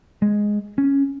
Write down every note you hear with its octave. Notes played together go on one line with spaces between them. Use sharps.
G#3
C#4